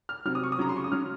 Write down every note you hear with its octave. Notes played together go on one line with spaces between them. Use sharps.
F6
C3 F#3 F6
D#6
C#6
D#6
C#3 F#3 A#5
C6
C#6
D#6
C#3 F#3 F6